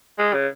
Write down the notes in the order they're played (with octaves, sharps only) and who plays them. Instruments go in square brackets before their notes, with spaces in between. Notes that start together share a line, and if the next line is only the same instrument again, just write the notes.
[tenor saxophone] G#3
C#3